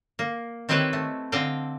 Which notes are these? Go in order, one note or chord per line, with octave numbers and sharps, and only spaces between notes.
A#3
D#3 C4 E4 G4 B4 C#5
A3
D3 C4 C5 D#5 F5 G5